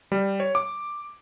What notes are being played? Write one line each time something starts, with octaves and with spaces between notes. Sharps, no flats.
G3
C#5
D6